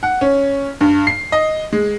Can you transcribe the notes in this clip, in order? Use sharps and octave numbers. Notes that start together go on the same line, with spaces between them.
F#5
C#4
G2
C7
D#5
G#3